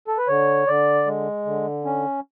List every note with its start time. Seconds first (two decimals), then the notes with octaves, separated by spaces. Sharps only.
0.08 A4
0.18 B4
0.28 D3 C#5
0.67 D3 D5
1.06 G#3
1.45 D3
1.85 C#4